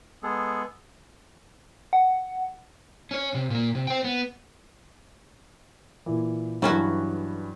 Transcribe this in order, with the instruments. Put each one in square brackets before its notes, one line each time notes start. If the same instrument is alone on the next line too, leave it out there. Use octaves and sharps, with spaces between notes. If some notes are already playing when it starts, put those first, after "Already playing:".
[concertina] G#3 B3 G#4 A4
[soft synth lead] F#5
[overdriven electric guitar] C#4 C#5
C3
A#2 A#3
C3
C5 G5
B3
[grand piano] A#2 E3
[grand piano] G2 E3 [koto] F#3 C#4 F#4